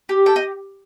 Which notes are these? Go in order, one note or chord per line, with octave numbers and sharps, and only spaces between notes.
G4
A4 G5
D#5